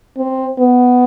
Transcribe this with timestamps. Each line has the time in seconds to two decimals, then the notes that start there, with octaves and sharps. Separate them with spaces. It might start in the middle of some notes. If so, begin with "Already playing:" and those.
0.18 C4
0.58 B3